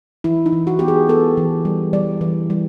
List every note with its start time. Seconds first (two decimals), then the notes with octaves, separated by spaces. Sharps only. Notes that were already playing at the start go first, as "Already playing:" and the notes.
0.24 E3 E4
0.46 D#4
0.53 E3
0.67 F#4
0.79 B3 G4
0.88 G#4
1.09 B3 A4
1.37 E3
1.65 G3
1.93 G3 D5
2.21 E3
2.50 G3